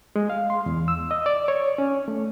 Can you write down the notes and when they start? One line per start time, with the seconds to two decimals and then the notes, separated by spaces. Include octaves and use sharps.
0.16 G#3
0.30 F5
0.50 C6
0.66 E2
0.88 E6
1.11 D#5
1.26 D5
1.48 C#5
1.78 C#4
2.08 A3